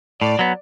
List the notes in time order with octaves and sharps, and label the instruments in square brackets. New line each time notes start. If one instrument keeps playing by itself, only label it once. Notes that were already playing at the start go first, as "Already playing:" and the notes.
[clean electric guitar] A2 [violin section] D5
[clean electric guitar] F#3 B3